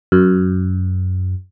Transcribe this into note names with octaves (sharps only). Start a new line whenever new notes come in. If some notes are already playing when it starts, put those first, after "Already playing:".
F#2